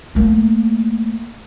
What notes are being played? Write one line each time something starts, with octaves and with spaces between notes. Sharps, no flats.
A3 A#3